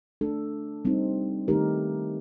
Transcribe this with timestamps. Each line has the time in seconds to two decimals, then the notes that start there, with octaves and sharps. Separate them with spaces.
0.21 A3 D4 A4
0.85 G3 C4 D#4
1.48 D#3 A3 D#4 G4 A#4